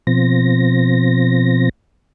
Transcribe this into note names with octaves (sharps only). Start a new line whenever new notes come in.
B2 F3 C4 A#6